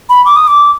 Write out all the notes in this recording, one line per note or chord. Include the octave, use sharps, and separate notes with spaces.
B5
D6
D#6
D6